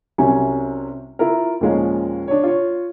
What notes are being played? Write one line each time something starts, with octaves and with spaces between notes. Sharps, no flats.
C2 C3 F#3 C#4 G#5
E4 F4 A#4
D#2 A#2 F3 G#3 C#4 F5
D4 C#5
F4 C#5